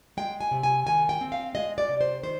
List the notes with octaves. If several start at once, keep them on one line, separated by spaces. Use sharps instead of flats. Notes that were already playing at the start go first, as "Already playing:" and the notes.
G#3 G5
G#5
C3
G#5
D#3 G#5
G5
C4
F5
G#3 D#5
D5
C3
C5
D#3 C5